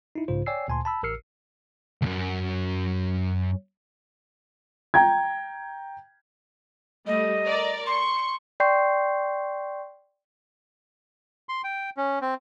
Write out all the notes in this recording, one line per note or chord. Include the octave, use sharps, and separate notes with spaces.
D#4 E4
B1 G#2 C#3 F4 C5
C#5 D5 G5 G#5 E6 C7
D2 A#2 G#5 A5 C6
A5 B5 E6
A1 A#4 E6 F6 C7 C#7
C#2 F#2
G5 A#5 G#6
G3 A3 D#5
A#4 D5 A#5
C6 C#6
D5 G5 C6 C#6 G6 C7
C6
G5
C#4
C4